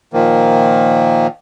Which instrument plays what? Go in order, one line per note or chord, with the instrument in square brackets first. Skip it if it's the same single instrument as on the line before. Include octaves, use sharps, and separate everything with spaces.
[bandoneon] A#2 D#3 F3 A#3